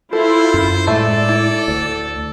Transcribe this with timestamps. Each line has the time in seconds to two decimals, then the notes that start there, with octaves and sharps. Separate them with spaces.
0.13 E4 F4 A4 C5
0.54 F#2
0.87 A2 G#3 A3 A4 D5 E5
1.29 E4
1.68 D2